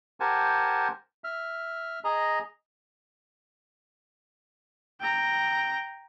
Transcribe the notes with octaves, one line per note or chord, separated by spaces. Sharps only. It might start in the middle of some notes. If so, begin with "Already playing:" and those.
G4 A#4 C5 F#5 G#5 A5
E5 F6
G#4 D#5 A#5
G5 A#5